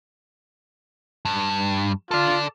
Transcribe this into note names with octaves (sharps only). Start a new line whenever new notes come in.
G2
F4 A4 D5